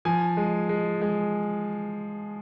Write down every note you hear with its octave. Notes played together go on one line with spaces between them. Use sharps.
F3 G#5
G#3
G#3
G#3